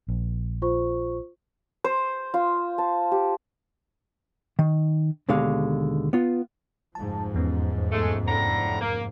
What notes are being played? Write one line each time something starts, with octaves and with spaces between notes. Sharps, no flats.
A#1
F4 C5 C#6
C5
F4
A5
G4
D#3
D#2 B2 D3 G#3 F5
B3 F4
F1 G#2 F3 A5
E2 B3 C#4
G#3 A3
A2 D3 A#5
A#3